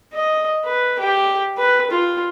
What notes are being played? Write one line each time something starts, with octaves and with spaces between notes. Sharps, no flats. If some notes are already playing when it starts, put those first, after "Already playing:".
D#5
B4
G4
B4
F4